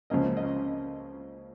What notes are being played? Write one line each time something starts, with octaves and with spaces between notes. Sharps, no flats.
C#2 C#3 F3 A#3 C#4 D#5
D#5